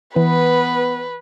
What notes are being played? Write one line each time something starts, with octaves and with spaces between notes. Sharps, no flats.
E3 B3 B4